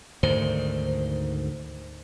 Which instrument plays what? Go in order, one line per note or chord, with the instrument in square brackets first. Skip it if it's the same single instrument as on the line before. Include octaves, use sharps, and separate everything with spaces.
[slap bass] D2 G#2 D#3 [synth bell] C5